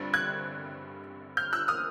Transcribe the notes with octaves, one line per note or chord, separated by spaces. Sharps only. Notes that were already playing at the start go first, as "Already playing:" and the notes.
Already playing: G2 D3 G3 C4 A6
F#6 G#6
F6 G6
E6 F#6
D#6 F6